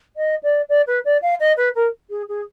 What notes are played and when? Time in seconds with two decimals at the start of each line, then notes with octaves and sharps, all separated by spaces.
0.16 D#5
0.43 D5
0.69 D5
0.87 B4
1.05 D5
1.22 F5
1.40 D#5
1.56 B4
1.75 A#4
2.10 G#4
2.28 G#4